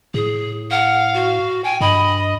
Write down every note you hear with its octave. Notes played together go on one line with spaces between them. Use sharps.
A2 G#4
F5 F#5
F#4
G5 G#5
G2 D#5 B5